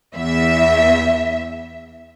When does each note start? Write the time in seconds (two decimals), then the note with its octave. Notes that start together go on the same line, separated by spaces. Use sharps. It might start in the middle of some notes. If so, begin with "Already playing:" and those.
0.13 E2 E5